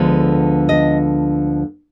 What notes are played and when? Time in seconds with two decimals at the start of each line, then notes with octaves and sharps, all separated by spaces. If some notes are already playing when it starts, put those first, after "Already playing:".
Already playing: D2 D3 F3 G#3 B3
0.69 D#5